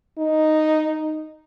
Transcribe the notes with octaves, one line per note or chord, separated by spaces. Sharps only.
D#4